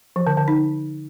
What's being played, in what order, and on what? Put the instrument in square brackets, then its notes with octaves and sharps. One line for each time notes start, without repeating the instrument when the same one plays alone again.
[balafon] F3
D3
D3
D#4